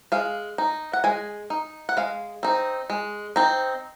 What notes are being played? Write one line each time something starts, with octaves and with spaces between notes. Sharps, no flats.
G#3 F5
D#4
F#5
G#3 G#5
D#4
F#5
G#3 F5
C4 D#4
G#3
C4 D#4